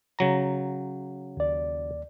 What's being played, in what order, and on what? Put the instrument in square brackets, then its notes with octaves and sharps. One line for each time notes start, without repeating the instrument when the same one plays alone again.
[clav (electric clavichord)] C#3 F#3 A#5
[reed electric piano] D#2 D5